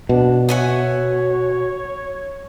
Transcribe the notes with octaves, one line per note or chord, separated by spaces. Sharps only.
B2 D4
F#4 C#5 E5 G#5